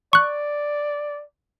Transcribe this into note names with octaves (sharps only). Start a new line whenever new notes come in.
D5 C#6 F#6